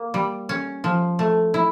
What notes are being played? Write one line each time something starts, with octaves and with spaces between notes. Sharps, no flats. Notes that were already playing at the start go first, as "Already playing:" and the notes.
Already playing: A#3
G3
C#4
F3
A3
E4